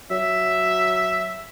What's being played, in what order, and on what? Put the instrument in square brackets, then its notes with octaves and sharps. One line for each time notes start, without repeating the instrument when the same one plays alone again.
[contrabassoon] F#3 [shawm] E5